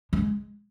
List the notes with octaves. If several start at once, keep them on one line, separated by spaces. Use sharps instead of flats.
G#3